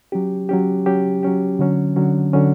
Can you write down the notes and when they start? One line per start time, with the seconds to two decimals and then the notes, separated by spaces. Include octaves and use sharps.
0.12 F#3 C#4 G4
0.49 F#3 C#4 G4
0.86 F#3 C#4 G4
1.23 F#3 C#4 G4
1.59 D3 F#3 C#4
1.96 D3 F#3 C#4
2.33 D3 F#3 C#4